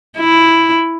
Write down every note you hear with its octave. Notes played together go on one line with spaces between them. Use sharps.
E4